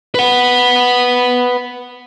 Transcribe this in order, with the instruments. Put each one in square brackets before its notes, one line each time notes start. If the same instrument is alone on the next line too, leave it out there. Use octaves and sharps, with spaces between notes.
[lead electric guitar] B4 F#5